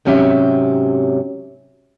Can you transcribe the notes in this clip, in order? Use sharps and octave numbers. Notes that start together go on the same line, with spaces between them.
G#2 C3 F#3 C#4 G4 E5